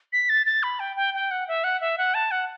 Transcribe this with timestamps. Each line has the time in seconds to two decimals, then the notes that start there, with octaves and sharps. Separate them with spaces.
0.13 B6
0.29 A6
0.46 A6
0.63 B5
0.80 G5
0.96 G5
1.14 G5
1.31 F#5
1.48 E5
1.64 F#5
1.81 E5
1.98 F#5
2.14 A5
2.31 F#5